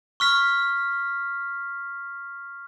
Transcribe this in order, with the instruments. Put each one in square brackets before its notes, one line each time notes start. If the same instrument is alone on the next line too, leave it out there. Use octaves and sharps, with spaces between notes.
[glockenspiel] C#6 F6 B6